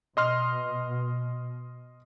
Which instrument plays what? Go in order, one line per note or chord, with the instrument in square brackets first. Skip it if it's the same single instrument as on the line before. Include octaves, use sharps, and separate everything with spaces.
[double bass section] B2 [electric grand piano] D#5 C6 F6